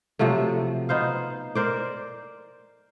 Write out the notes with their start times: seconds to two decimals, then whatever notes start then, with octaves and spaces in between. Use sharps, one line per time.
0.19 C3 F3 F#3 A3
0.89 B3 D#4 C5 F5
1.55 A#4 C5 D5